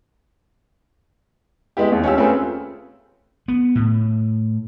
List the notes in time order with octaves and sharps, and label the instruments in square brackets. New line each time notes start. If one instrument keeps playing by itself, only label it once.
[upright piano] G#3 B3 E4 G4
D#2
C#4 F4 G4 E6
A3 C4 C#4 F4 G#4 B4
[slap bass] B3
A2